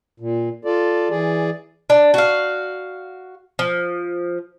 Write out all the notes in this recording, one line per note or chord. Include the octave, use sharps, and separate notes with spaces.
A#2
F4 A4 D5
E3 G#4 D5
D4
F#4 F5
F3